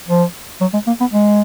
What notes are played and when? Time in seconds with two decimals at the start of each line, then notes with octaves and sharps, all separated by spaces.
0.08 F3
0.61 F#3
0.73 G#3
0.87 A#3
1.00 B3
1.13 G#3